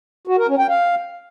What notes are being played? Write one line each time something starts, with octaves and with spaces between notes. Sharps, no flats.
F#4
A#4
C#4
G5
F5